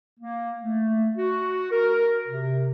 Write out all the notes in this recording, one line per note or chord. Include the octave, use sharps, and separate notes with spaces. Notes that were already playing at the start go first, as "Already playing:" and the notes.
A#3
A3
F#4
A#4
C3